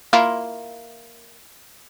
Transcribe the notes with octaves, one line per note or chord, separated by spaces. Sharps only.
A#3 E4 F4